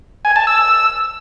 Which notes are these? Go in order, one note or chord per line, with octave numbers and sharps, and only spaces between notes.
G#5
A5
E6